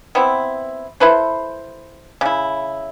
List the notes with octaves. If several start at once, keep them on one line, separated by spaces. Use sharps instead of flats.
B3 C4 E4
E4 A4 B4 C5
C#3 E4